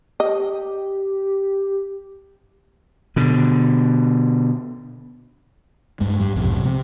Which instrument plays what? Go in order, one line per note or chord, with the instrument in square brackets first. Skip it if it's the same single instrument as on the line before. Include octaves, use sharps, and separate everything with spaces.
[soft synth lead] G4 [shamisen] D#5
[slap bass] B2 D3
[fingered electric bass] G2 G#3
G2 G3
B1 F2 G#2 C3
C3 C4